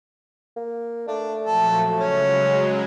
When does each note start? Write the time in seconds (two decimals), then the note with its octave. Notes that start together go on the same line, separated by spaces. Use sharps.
0.56 A#3
1.08 A3 D4
1.44 A#2 F3 F#3 A4
2.00 C#3 F#3 G#3 C#4